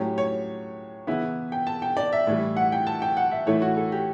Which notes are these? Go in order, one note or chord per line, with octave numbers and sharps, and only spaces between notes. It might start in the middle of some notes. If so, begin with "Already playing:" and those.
Already playing: A2 F#3 C#4 G4
C#5
C#3 E3 B3 E4
G5
A5
G5
D5
E5
A2 E3 G3
F#5
G5
A5
G5
F#5
E5
A2 E3 A3 E4 C#5
F#4
A4
G4